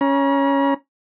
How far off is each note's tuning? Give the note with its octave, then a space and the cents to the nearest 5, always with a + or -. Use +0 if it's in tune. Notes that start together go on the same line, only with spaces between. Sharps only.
C#4 +0 A#5 +40